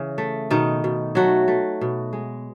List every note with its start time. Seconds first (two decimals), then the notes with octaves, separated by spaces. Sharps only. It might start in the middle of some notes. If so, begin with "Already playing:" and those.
Already playing: C#3 E3
0.18 A3
0.50 B2 D#3 D#4
0.84 B2
1.15 F#3 A3 F#4
1.48 A3
1.81 B2
2.13 G#3